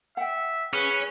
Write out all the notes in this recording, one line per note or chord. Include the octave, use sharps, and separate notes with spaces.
E5 F#5 G5
C#4 G#4 B4 C5